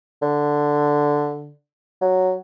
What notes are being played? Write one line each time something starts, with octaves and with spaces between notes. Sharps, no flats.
D3
F#3